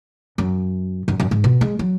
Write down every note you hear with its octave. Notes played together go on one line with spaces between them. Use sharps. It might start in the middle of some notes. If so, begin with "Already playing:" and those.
F#2
F#2
F#2
G#2
B2
G#3
F#3